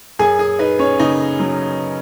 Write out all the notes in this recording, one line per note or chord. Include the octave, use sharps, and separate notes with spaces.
F#2 G#4 G#5
G#4
D#4 B4
C#4 C#5
C#3 D#4 D#5
F#3